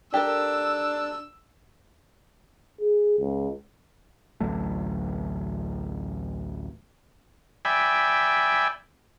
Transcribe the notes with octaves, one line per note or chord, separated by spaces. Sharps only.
D4 G4 A4 A#4 E6
G#4
C#2
A1 D2 F#3 A3
D5 E5 G5 G#5 B5